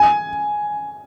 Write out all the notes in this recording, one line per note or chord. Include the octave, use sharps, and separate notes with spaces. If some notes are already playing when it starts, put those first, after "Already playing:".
Already playing: G#5